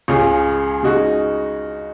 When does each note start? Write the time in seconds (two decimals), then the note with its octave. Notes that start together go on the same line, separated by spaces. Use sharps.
0.08 C#2 C#3 G#3 C#4 G#4
0.83 C#3 G#3 D#4 F#4